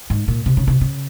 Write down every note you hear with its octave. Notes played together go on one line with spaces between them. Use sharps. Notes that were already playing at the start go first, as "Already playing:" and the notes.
G#2
A#2
C3
C#3
C3
C#3